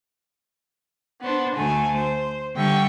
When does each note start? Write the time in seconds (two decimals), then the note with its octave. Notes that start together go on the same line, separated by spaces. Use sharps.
1.22 B3 D4 C5
1.56 D2 A3 G#5
1.96 C5
2.55 D3 G3 E5 G5 C#6